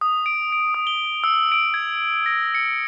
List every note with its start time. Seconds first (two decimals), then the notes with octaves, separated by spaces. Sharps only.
0.01 D#6
0.26 D7
0.52 D7
0.74 D#6
0.87 G7
1.24 E6
1.52 D7
1.74 G#6
2.26 A#6
2.55 C#7